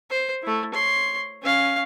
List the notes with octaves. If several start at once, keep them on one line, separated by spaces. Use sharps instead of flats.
C5
A3 E4
C#5 C6
C#4 F5